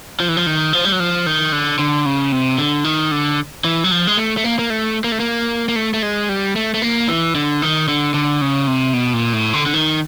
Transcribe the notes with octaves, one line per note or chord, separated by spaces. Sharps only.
F3
E3
F3
D#3
F3
G3
F#3
F3
D#3
D3
D3
C#3
C3
D3
D#3
D3
E3
F#3
F3
G#3
A3
A3
A#3
A#3
A3
A#3
A3
A#3
A#3
A3
A3
G#3
G3
A3
A3
A#3
E3
D3
D#3
D3
D3
C#3
C3
B2
A#2
A2
D3
D3
D#3